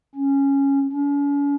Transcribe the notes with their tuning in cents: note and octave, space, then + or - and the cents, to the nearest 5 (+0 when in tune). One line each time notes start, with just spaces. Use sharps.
C#4 -5
C#4 +45